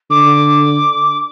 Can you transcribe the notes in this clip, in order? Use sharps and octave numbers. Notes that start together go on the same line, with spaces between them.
D3 D6